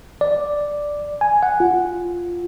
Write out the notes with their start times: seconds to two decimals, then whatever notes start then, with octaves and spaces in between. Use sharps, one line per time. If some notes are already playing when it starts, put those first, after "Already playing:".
0.21 D5
1.21 G#5
1.43 F#5
1.60 F4